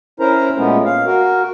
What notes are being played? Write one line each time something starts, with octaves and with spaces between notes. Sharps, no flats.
C#4 E4 A#4 C5 A#5
A#2 G#3 A3 B3 C#4
F5
F#4 A#4